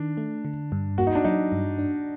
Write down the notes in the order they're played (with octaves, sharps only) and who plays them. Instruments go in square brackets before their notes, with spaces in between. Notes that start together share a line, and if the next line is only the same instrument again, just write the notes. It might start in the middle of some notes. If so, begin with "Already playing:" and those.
Already playing: [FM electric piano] D#3 [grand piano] D4
[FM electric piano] A3
D3
G2
[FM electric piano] A#3 [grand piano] F#4
[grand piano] D#4
D4
[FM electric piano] F#3 [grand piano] D#4
[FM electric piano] G2
D4